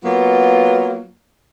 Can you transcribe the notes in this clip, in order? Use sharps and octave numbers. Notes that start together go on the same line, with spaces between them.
F#3 A#3 B3 F4